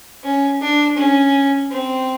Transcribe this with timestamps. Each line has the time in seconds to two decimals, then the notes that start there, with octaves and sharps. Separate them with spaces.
0.23 C#4
0.61 D4
0.97 C#4
1.71 C4